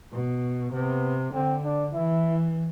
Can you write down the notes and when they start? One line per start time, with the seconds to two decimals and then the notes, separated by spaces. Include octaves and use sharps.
0.13 B2
0.73 C3 B3
1.33 D3 C4
1.64 D4
1.94 E3 E4